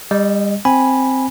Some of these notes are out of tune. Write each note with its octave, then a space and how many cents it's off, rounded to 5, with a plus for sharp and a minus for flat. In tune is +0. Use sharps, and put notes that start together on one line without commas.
G3 +35 D#5 -10
C4 +0 G#5 +0 B5 -5